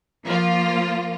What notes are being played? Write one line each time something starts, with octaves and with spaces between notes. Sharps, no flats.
F3 A#3 F4